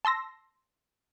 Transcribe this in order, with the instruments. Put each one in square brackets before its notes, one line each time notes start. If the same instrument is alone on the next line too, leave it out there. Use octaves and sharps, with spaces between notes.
[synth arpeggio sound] A5 C6 E6 A#6